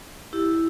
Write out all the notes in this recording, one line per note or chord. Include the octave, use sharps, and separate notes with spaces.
E4 G4